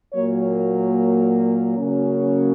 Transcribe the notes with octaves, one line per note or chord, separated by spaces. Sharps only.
A#2 F#3 A#3 C#5
C#3 F#3 A#3 C#4